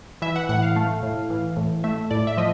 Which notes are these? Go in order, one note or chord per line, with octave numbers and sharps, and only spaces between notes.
E3 E5
F#5
A2 F#5
F5
A3
A2
E3
A2
A3 E5
A2 D5
E5
F3 D#5